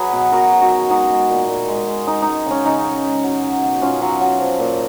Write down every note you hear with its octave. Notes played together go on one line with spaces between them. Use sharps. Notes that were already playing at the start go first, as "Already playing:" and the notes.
Already playing: F#3 G#4 B4
B2
B2 F#4 A#4
F#3
D#4 F#4
F#3
G#3 D#4 F#4
G#3
A#2
A#2
G#3
G#3
G#3 D#4
G#3 D#4
C#3 C#4
C#3 D#4
G#3
G#3
F#3
F#3
B2
B2 C#4 F4
F#3
F#3
F3
A#2